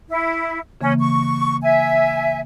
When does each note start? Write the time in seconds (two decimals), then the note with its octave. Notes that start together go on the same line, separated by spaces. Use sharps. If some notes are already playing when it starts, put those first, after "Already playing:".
0.09 E4
0.81 C#3 E3 A#3 C#4
1.00 C#6
1.62 E5 G#5